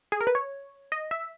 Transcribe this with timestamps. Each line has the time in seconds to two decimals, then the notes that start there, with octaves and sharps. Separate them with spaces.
0.12 G#4
0.21 A#4
0.27 B4
0.35 C#5
0.92 D#5
1.11 E5